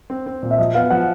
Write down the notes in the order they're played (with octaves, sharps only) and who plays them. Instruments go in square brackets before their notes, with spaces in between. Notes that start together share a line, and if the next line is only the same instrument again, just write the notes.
[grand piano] C4
C4
A#2
[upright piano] E5
[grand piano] F3 [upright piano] D#5
[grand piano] B3 [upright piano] F5
[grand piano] F3 [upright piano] F#5